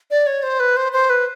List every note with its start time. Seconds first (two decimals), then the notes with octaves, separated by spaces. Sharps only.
0.11 D5
0.27 C#5
0.43 C5
0.60 B4
0.77 C5
0.92 C5
1.10 B4